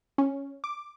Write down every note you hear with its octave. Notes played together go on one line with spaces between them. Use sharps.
C#4
D6